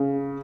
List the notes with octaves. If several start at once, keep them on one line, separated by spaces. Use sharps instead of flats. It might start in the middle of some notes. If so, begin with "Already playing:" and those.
Already playing: C#3